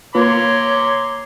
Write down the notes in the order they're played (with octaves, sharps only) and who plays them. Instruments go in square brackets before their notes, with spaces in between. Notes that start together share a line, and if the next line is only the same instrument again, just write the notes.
[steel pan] A#3 F4 B4 [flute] C#5 [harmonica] A#5 C6 D6